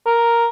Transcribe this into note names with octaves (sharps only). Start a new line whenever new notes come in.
A#4